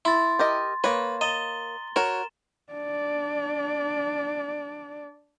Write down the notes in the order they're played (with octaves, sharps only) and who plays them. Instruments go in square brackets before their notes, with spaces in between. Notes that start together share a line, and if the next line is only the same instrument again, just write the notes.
[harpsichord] E4 [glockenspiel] C6 A6
[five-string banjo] G4 A#4 D#5
[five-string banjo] A#3 C#5 [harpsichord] B4
[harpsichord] D#5 [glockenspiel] A#5 A6 G7
[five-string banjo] F#4 C#5 [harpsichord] A#4 [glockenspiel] E7
[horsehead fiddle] D4 D5